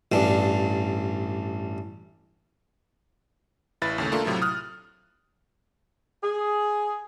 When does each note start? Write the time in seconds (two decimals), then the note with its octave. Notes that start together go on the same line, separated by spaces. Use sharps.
0.12 A1 G2 D4
3.82 A1 E4 B4 A6
3.98 D#2 C#3 A3
4.12 A3 A#3 D4 F4 A4 A#4
4.24 A2 C3 F#3 E4 F4
4.42 D#6 F6 F#6
6.24 G#4